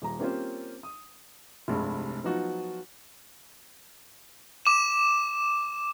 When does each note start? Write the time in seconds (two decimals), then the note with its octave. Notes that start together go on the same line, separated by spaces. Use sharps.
0.02 D#1 A#5
0.19 A#3 C4 C#4 F4 G4 C5
0.83 D#6
1.68 F1 C2 G2 G#3
2.24 F3 F#3 B3 D#4 F4 F#4
4.65 D6 E7